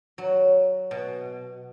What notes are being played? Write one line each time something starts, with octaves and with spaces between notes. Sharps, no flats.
F#3
B2